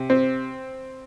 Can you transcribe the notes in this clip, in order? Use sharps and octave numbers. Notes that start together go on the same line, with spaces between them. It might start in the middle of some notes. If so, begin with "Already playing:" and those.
Already playing: C3
C4